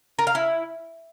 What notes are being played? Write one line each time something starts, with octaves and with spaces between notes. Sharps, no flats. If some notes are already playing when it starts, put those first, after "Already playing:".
A#4
F5
E4